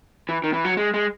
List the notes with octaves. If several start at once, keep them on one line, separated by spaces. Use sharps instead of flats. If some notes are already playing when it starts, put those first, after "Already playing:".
E3
D#3
E3
F#3
G#3
G#3